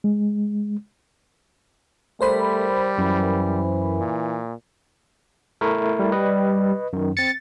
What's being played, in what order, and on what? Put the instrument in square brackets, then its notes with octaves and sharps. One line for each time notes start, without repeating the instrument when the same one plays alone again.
[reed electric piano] G#3
[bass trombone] G3 [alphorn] A3 [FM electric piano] A#4 C5 B5
[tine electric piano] F#2 [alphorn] E3
[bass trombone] A#2
[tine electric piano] A3 E4 A#4
[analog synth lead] G3
[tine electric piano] B4 D#5
F#2 D#3
[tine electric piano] C4 C#7 [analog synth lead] A6